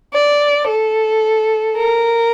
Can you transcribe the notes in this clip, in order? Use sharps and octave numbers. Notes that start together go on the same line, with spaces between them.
D5
A4
A#4